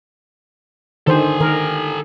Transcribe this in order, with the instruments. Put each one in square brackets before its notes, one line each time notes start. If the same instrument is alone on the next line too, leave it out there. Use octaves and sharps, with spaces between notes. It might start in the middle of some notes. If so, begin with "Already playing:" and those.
[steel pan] D3 D#3 C5 [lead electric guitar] A4 G#5
[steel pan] D#3 A#4